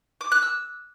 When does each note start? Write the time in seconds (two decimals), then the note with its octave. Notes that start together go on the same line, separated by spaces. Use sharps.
0.21 D6
0.32 F#6
0.42 E6